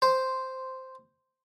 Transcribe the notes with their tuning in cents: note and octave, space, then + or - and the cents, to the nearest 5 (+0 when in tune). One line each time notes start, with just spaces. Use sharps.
C5 -5